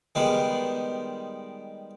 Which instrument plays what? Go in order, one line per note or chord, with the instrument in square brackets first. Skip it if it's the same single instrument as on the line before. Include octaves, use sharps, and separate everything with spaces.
[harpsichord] D#3 G3 G#3 B3